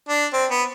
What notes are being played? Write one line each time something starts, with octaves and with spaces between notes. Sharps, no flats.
D4
C4
B3